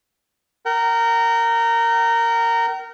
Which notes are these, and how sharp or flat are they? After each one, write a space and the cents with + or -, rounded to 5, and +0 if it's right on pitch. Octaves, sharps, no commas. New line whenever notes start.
A#4 -10 G5 -45